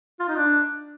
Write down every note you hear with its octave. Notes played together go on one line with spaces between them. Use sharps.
F4
D#4
D4